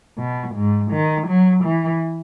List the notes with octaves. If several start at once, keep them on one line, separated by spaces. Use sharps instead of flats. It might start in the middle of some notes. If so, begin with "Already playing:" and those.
B2
G#2
D#3
F#3
E3